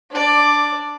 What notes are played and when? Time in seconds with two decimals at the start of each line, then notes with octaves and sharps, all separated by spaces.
0.10 D4 D5